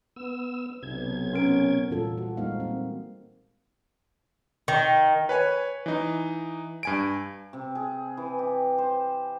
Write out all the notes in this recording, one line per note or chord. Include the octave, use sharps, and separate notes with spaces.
B3 E6
B1 C3 G#6
B3 C#4 A#4 D7
A#2 E3 G3 F4 F#4 A4
F#4
G3 G#3 A#3 D#4 C5 F5
C4
D#3
B4 C#5 G#5
E3 D#4
G2 G#5 D7
C3
G#4
E3
G4
C5